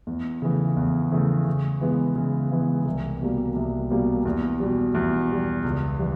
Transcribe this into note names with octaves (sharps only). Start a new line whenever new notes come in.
E2
C#3 E3 A3
E2
C#3 E3 A3
C#3
E3 G#3 B3
C#3
E3 G#3 B3
C2
B2 G3 A#3
C2
B2 G3 A#3
E2
B2 G3
E2
B2 G3
C#2
E3 G3